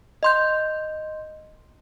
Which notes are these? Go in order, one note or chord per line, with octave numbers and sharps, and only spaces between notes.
D#5 C6 G6